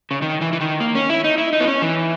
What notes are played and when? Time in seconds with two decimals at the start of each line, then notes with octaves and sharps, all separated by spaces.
0.11 C#3
0.22 D#3
0.41 E3
0.53 E3
0.61 D#3
0.80 A#3
0.95 C#4
1.10 E4
1.24 D#4
1.38 E4
1.53 D#4
1.60 B3
1.67 C#4
1.82 E3